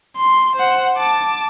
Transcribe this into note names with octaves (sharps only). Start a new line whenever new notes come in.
C6
C5 F#5
A5 D6